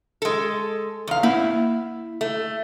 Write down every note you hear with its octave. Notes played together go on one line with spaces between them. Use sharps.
G#3 A4
E2 F5
A#3 E4
A3